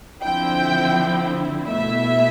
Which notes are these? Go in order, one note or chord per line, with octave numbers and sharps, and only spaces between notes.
D3 F3 C4 E4 G5
B2 A3 E4 E5